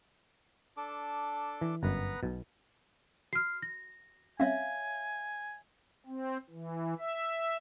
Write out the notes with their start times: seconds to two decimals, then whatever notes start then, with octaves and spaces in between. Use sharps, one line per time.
0.77 D4 A4 D6
1.61 E3
1.83 G1 F#2 B3 B4 A#5
2.23 B1 B2
3.33 F#4 F6 C7
3.62 A#6
4.40 G3 C4 C#4 C#5 E5 F5 G#5
6.06 C4
6.50 E3
6.99 E5